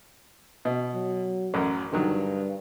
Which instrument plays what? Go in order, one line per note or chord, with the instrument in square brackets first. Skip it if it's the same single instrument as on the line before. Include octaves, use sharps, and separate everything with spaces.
[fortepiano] B2
[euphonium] F#3
[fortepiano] A1 F#2 A#4
[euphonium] G2 [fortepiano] D3 D#3 F#3